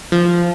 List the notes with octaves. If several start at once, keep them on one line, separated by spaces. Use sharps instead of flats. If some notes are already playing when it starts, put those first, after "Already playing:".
F3